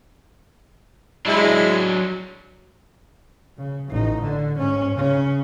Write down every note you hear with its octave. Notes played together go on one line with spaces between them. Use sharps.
F#3 G#3 D4 E4
C#3
A1 D#4
D3
G#2 C#4
C#3 C#4